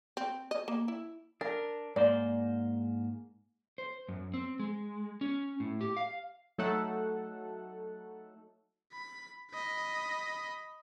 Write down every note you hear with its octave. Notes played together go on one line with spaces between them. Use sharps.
C4
D#5
A#3
E4
D4 A#4
G#2 A#3 C5 D5
C5
F#2
C4
G#3
C#4
A2
G4
F5
F#3 A3 D#4 A4 F#5
B5
D#5 B5